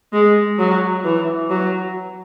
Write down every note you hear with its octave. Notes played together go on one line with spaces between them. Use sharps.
G#3
F#3
E3
F#3